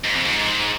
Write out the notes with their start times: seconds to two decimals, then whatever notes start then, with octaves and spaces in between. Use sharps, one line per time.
0.05 G#2
0.16 F2
0.25 G#2